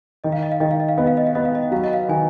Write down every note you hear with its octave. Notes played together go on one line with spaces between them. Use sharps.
D#3 D#5
F5
D#5
F5
D#3 D#5
F5
D#5
F5
B3 D#5
F5
D#5
F5
B3 D#5
F5
D#5
F#3 F5
D#5
F5
D#3 G#5